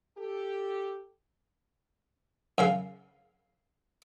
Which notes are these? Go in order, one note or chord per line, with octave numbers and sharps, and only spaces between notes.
G4 A4
F#2 C#3 F5